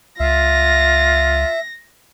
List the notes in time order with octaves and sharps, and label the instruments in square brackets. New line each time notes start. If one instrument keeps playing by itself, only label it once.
[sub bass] C#2 [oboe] F4 [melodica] E5 [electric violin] A#6